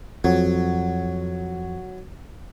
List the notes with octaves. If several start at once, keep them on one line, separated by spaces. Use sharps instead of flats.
F2 F#3